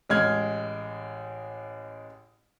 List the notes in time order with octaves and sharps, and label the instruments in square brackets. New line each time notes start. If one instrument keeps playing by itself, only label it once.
[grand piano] A1 G#3 F6 G#6